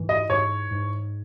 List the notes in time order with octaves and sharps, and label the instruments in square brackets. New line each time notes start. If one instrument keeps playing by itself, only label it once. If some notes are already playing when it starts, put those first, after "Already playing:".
Already playing: [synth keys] G#2 E3
[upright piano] D#5
[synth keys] G#2 [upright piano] C#5
[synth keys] G#2